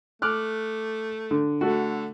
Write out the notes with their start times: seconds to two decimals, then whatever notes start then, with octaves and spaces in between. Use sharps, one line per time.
0.22 A3 D6 F6 F#6
1.31 D3
1.61 D3 A3 F#4